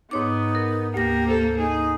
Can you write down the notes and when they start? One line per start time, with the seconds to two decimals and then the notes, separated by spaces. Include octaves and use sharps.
0.11 G#2 B3 D#4 C#5 D6
0.55 A#4
0.94 D2 A#3 G4 A#6
1.28 A4 C5
1.58 D#4 G#4